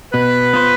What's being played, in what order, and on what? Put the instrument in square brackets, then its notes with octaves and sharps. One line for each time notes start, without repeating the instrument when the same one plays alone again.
[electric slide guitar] B2 [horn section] B4
[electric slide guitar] B3 F4 C5